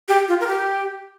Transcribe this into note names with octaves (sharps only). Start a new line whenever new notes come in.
G4
F4
A#4
G4